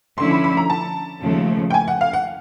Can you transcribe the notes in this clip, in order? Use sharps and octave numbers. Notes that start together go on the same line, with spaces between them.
D3 F3 A3 C#4 E4 C6
B5
B5
A#5
A5
D#2 C#3 F3 A3
G5
G#5
F#5
F5
F#5